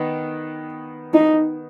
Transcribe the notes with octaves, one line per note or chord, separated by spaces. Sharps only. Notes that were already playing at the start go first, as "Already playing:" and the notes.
Already playing: D#3 B3 D#4
D#4